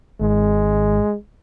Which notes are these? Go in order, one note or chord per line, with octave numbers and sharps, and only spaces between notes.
G#1 G#3